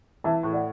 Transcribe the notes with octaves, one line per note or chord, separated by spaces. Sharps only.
E3 E5 A5
A2
D5 F#5